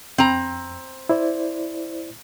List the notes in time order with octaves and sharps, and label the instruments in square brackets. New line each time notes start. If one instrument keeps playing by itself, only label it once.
[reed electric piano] F2 [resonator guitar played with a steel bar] C4 A#5
[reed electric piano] E4 C5 D5